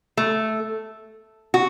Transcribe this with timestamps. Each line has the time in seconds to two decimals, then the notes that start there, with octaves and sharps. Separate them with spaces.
0.17 A3
1.54 F#4